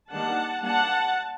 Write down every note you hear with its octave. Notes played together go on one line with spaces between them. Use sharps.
D#3 G3 A#3 D4 F#5 A5
G3 A#3 D4 F#5 A5